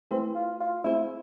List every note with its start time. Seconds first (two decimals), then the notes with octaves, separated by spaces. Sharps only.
0.11 A3 C4 E4 G#4 B4
0.35 F4
0.60 F4
0.84 A3 C4 E4 G#4 C5